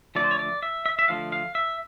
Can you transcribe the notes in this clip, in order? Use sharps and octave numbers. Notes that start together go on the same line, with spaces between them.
D3 F3 A3 D5
C5
C#5
D5
E5
E5
E5
D3 F3 A3 F5
F5
E5